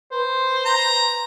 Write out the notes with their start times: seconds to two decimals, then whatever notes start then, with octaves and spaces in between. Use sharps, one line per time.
0.12 B4 C5
0.65 A#5